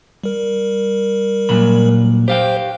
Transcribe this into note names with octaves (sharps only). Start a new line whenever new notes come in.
G3 A#4
A#2 F#3 B5
G4 C5 F5 G5